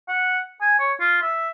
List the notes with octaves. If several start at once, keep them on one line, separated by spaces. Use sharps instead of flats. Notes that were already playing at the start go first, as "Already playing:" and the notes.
F#5
G#5
C#5
F4
E5